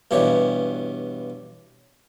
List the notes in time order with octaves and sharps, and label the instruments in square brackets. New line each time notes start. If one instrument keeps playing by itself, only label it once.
[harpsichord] G2 B2 E3 G4 C#5